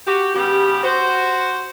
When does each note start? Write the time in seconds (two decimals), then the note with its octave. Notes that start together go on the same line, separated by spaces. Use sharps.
0.07 F#4 G4
0.35 C#3 G3 B3 G4
0.83 F#4 C5